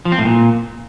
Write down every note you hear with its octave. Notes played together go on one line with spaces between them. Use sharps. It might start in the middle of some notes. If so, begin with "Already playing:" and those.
F3
C4
A2
A#2